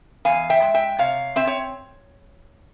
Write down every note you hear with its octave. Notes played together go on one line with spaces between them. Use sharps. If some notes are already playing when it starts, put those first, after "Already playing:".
E2 F5 G#5
E5 G5
G#3
E5 G5
C3 C#5 F5
C4 E5
C#5